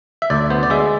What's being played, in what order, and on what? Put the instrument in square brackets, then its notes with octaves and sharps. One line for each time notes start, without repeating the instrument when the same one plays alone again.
[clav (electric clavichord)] E5
D2 D5
B3 C5
D5
G#3 E5